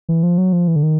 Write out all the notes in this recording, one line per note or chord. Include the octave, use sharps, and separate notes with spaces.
E3
F3
F#3
F3
E3
D3
D#3